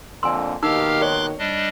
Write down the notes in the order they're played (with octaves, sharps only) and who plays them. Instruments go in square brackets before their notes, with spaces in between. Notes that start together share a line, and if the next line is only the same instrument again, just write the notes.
[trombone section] F2 A#2 D3 [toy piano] G#5 C6 [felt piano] E6
[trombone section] D#2 B2 D#3 [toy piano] D#4 [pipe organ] G4 F5 F6 [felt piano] E6
[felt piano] C#5 [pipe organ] C6 D6 F#6
[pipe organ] G3 D4 D#5